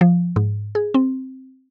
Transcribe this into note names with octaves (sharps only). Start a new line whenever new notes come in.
F3
G#2
G#4
C4